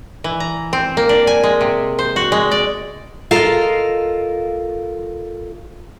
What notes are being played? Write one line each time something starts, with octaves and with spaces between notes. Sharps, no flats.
E3
A#5
C4
A#3
D4
G#5
G#3
C3
C5
F#4
G#3
D5
F4 A4 A#4 D#5 F5